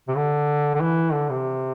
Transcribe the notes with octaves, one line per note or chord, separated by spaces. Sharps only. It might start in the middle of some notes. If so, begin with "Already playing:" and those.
C3
D3
D3
E3
D3
C3